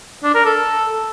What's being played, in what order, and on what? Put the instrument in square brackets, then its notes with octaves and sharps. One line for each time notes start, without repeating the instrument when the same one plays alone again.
[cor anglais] D4
A#4
A4